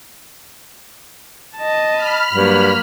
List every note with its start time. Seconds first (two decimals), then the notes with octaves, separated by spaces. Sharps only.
1.57 D#5 A5
1.93 B5 F6
2.33 G2 F#3 A#3